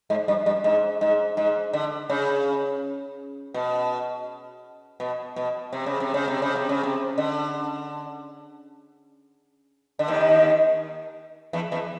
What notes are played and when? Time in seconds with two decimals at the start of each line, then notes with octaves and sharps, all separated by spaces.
0.10 G#2
0.28 G2
0.46 G2
0.64 G#2
1.01 G#2
1.37 G#2
1.73 D3
2.10 C#3
3.54 B2
5.00 B2
5.36 B2
5.73 C3
5.86 C#3
6.00 C3
6.14 C#3
6.28 C3
6.42 C#3
6.56 C3
6.69 C#3
6.83 C3
7.18 D3
9.99 D3
10.08 D#2 D#3
11.53 E2 E3
11.72 E2 E3